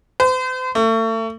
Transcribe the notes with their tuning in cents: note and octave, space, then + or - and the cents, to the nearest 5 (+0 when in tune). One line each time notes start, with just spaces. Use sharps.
C5 -40
A3 +35